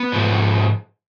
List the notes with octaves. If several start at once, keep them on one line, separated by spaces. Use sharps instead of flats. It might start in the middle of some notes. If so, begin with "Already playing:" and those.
Already playing: B3
G#2 F3 A3